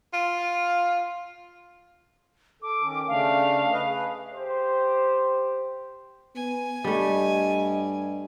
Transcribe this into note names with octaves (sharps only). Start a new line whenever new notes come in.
F4
A4 D6
D#3 C#4
C#3 A3 D4 F5
B4 D#5
G#4 B4
G4 C5
B3 G#5
G2 G3 A3 D#5